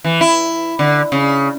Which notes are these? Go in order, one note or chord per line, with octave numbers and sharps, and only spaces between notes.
E3
E4
D3
C#3